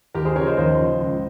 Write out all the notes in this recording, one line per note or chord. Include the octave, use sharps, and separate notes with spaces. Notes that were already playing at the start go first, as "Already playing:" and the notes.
D#2 G4 A#4
G#4 C5
C#3 F3 A#4 C#5
C5 D#5
D#2 C5 D#5
C#3 F3
C#2